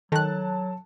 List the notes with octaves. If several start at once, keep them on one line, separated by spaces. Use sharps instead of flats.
D#3 F#3 A4 A5 F#6